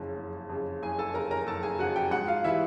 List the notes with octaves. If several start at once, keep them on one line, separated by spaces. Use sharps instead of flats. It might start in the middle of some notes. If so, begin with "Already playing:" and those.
Already playing: F#1 F2 C#3
F#1
F2 C#3
F#1 G#4 G#5
A4 A5
F2 C#3 A#4 A#5
A#4 A#5
F#1 A4 A5
G#4 G#5
F2 C#3 F#4 F#5
G4 G5
G#2 F#4 F#5
F4 F5
E3 G3 E4 E5